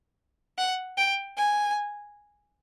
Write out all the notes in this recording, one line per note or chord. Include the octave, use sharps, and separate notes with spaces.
F#5
G5
G#5